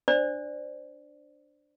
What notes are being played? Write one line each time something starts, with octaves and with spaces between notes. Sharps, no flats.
D4 C5 D5